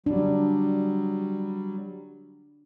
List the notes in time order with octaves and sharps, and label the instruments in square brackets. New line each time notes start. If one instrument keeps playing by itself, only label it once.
[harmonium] F#3 G3 [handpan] D4